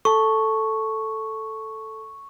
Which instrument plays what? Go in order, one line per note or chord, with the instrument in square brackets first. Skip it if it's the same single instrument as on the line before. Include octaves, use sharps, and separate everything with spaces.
[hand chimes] A4 A5 [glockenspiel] C#6